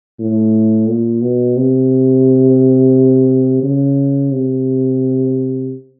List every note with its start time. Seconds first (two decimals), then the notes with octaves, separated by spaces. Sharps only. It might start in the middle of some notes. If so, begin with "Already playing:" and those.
0.20 A2
0.89 A#2
1.23 B2
1.57 C3
3.63 C#3
4.32 C3